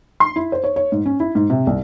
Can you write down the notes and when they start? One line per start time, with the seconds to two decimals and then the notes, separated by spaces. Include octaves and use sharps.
0.20 C6
0.36 E4
0.52 C5
0.64 C#5
0.76 C#5
0.92 G#2
1.06 C#4
1.20 E4
1.35 G#2
1.50 C3
1.67 C2